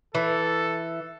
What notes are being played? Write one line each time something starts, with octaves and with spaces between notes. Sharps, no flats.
E3 A4